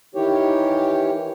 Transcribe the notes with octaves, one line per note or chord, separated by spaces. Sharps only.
D#3 E3 G4 C#5